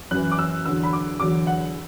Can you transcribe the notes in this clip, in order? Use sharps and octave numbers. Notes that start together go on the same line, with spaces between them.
F#2 E3 F#6
D6
E6
E2 D3 F#3 E6
B5
D6
E2 D3 F#3 D6
F#5